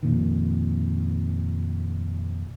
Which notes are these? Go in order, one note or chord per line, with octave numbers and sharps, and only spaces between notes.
F2 A#2 D#3